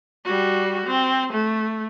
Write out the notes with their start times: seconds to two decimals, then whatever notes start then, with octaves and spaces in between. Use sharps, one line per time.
0.25 G3 F#4
0.87 C4
1.33 A3